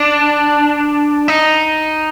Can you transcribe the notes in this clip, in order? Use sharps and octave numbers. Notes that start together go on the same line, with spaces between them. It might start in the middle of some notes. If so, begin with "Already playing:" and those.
Already playing: D4
D#4